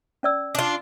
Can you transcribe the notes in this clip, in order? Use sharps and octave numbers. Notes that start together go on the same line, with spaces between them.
C#4 D5 E6
D4 F4